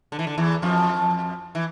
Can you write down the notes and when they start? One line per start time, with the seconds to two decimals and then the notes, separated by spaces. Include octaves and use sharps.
0.12 D3
0.19 E3
0.27 D3
0.38 E2 E3
0.62 F2 F3
1.55 E3